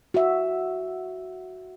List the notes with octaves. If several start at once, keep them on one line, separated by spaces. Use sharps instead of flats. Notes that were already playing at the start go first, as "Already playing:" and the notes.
F#4 E5